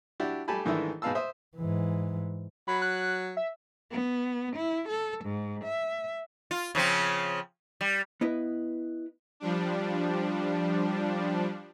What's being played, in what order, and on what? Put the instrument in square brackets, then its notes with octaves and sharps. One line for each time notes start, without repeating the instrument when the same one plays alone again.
[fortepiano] D4 E4 F#4 G4 D5
G3 A3 G4 G#5 A5 B5
G#2 D#3 E3 A3 D4 E4
G#2 B2 B4 F5 A5 E6
C5 E5 D#6
[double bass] G#2 E3
[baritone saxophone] F#3 [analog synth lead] B5
[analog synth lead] F#6
E5
[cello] B3
E4
A4
G#2
E5
[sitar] F4
C#3 F3 C4
G3
[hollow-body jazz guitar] B3 E4 B4 D#5
[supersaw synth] F3 G3 D4